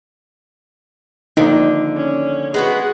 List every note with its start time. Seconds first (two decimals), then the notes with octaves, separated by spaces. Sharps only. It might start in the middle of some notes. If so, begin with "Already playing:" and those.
1.37 D3 D#3 F3 A#3 D#4
1.96 C#4
2.54 G#3 B3 F#4 G#4 F#5